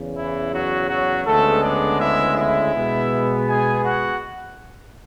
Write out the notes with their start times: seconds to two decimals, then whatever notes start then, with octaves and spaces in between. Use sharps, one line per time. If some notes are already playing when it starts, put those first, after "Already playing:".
Already playing: E2 C#3
0.16 E3 E4
0.53 F#3 F#4
0.89 F#3 F#4
1.26 D2 C#3 G#3 A3 B3 A4
1.63 D4 D5
1.99 E4 E5
2.37 E4 E5
2.74 B2 G#3 B3
3.47 G#4 G#5
3.84 F#4 F#5